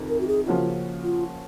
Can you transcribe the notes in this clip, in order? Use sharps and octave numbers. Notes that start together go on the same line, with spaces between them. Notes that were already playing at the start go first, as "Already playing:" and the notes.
Already playing: F2 C3 D#3
A#4
F#4
G#4
C#3 F3 A#3 C#4 F4 F#4
F4